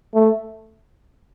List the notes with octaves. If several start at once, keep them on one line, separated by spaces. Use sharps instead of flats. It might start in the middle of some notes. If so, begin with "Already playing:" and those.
A3